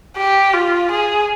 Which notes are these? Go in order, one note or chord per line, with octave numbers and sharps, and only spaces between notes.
G4
F4
G#4